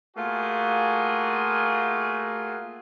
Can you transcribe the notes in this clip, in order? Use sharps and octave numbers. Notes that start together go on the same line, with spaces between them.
A3 A#3 F4 F#4 G#4